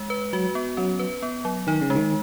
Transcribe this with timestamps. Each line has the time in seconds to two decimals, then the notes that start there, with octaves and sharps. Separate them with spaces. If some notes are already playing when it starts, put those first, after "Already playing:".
Already playing: G#3
0.10 B4
0.33 F#3 F#4
0.55 B3
0.77 F#3 C#4
0.99 B4
1.23 B3
1.45 F#3
1.67 D#3 D#4
1.81 C#3
1.90 G#3
1.95 D#3